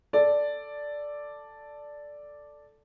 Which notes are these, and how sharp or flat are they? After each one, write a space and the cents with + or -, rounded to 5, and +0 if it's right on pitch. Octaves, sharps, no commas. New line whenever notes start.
A4 +0 D5 +0